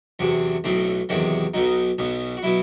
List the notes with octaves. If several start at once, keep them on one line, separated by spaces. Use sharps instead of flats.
E2 C3 F#3
B1 A2 F#3 C4
E2 C3 D#3 F#3
B1 B2 F#3 D#4
B1 B2 F#3
F#4
B2 F#3 E4